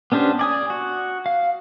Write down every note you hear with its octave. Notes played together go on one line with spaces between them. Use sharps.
B3 C#4 D4 G4 C5
D5 G#5 D#6
F#4
F5